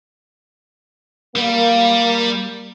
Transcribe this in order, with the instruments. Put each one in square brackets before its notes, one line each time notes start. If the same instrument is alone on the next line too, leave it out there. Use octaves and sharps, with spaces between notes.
[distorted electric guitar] G3 [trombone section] A#3